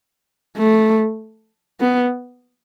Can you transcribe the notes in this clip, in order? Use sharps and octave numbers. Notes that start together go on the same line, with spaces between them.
A3
B3